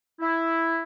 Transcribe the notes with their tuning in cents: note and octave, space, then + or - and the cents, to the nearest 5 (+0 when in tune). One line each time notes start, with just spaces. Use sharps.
E4 +0